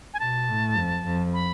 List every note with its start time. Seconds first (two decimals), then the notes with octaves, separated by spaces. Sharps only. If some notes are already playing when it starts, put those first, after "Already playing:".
0.14 G#5
0.20 B2 A5
0.48 A2
0.77 F2
1.05 F2
1.34 B5